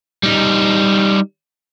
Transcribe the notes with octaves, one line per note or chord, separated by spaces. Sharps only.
G3 D#4